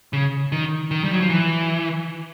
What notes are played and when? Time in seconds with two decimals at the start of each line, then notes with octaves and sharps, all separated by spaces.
0.13 C#3
0.52 D#3
0.91 D#3
1.04 G3
1.13 F#3
1.21 F3
1.30 E3